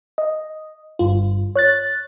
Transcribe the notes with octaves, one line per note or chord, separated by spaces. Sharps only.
D#5
G1 G2 F4
C#5 F#6 A6